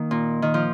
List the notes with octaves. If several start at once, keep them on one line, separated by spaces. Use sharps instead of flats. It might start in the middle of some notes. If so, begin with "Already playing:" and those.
Already playing: D#3 A#3
A#2
D#3
F3